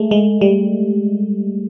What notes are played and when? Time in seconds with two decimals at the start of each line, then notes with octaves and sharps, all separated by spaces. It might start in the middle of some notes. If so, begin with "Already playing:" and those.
Already playing: G#3 A3
0.11 G#3
0.41 G3